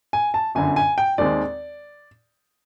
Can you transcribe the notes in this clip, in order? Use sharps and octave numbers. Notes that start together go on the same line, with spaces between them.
G#5
A5
G1 F#2 D3 G#5
G#5
G5
D#2 D#3 G#3 C4 D5